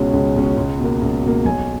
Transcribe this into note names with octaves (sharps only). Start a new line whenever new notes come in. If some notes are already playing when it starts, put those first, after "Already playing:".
Already playing: C#2 B2 G#3 C#4
C#2
B2 G#3 C#4
C#2
B2
A#3
C#2
B2 A#3
B1 G#5